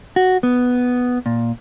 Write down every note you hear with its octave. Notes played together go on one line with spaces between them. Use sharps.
F#4
B3
A#2